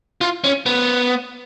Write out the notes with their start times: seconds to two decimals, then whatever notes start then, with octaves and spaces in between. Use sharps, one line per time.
0.21 F4
0.44 C#4
0.66 B3